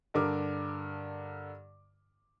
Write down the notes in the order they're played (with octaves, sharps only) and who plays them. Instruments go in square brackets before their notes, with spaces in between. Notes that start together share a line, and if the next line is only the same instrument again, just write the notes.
[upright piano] G2 D3 A#4 D6